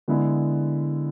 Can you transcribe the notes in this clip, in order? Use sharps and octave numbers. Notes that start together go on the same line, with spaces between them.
D3 G#3 B3 E4